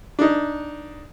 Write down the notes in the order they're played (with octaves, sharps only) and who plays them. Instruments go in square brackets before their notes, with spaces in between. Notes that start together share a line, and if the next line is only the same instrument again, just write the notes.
[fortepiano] D4 D#4